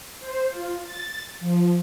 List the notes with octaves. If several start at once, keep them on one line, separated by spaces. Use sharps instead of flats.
C5
F4
A6
F3